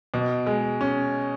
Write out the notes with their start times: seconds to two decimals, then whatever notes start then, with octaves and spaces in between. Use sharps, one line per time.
0.14 B2
0.46 G#3
0.81 C#4